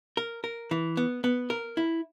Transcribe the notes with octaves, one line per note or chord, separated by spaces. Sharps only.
A#4
A#4
E3
B3
B3
A#4
E4